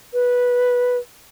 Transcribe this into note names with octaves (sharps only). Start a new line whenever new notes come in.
B4